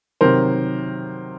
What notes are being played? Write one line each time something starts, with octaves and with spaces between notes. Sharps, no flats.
C3 D#3 F#3 A#4 C5